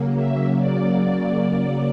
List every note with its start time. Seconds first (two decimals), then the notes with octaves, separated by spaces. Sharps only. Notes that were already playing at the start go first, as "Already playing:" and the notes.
Already playing: C#3 F#3 A#3
0.16 E5
0.58 D5